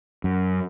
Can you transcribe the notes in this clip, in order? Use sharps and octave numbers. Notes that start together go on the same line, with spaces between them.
F#2